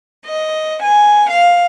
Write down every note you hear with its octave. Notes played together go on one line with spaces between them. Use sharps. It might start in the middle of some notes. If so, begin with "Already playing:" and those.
D#5
G#5
F5